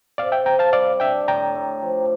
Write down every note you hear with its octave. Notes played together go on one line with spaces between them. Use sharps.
C3 D5 F5
E5 G5
C3 G5 A#5
F5 A5
G3 D5 F5
D4 E5 G5
A2 G5 A#5
A2
F3